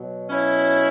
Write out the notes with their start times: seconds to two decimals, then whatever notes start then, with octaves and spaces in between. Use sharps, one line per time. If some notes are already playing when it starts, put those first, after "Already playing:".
Already playing: B2 F#3
0.30 C#4 E4